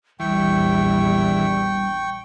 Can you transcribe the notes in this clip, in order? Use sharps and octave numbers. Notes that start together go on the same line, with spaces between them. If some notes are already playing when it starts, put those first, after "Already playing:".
A#1 E2 E3 G3 G5 C#6